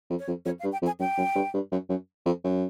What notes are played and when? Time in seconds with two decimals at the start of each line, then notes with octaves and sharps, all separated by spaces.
0.10 F2
0.19 C#5
0.28 F2
0.45 F2 C#5
0.60 F5
0.64 G2
0.72 G5
0.82 F2
0.86 G#5
0.99 F#2 G5
1.18 F#2
1.35 G2
1.54 G2
1.72 F#2
1.89 F#2
2.26 F2
2.44 F#2